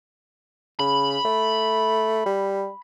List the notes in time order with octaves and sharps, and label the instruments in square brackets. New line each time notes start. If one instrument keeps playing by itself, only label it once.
[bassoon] C#3 [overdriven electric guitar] B5
[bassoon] A3
G3